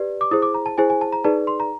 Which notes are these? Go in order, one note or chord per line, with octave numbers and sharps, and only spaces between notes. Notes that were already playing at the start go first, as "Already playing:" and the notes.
Already playing: G4 B4 D5
D6
E4 G#4 C5 D#6
D6
A#5
A5
E4 G#4 C5 G#5
G#5
A5
A#5
D#4 G#4 B4 D5 A5
C6
A#5